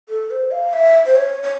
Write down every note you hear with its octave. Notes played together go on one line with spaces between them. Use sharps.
A4
C5
F5
E5
C5
C#5
C#5